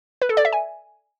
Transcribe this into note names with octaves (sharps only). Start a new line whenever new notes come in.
B4
A4
D5
E5
G#5